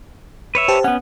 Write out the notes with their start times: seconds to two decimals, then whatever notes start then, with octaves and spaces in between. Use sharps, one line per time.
0.55 B4 C#5 E5
0.68 G4 C5 A5
0.84 B3 C#4 F#5